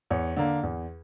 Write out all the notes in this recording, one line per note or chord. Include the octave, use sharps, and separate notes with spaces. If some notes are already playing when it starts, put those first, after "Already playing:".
E2 C#5
D3 A#3
E2